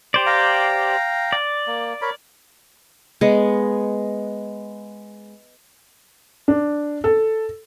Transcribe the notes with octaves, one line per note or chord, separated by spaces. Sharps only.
G4 C5 D5
F5 G5 A#5
D5
A#3
A#4 C#5 B5
G#3 B3
D4
A4